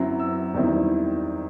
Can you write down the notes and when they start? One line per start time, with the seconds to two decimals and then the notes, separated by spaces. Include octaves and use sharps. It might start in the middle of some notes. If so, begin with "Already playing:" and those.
Already playing: F#2 F#3 C4 E4
0.19 E6
0.54 E2 D#3 G3 C4 E4